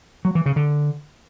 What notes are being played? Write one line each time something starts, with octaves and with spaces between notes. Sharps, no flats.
F#3
E3
C#3
D3